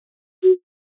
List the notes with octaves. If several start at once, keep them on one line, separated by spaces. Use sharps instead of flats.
F#4